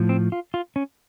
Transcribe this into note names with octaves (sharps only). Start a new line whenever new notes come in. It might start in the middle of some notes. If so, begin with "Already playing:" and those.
Already playing: A2 F3
C4
F4
F4
C#4